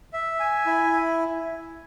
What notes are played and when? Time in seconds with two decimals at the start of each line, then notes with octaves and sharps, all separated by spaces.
0.13 E5
0.40 G#5
0.66 E4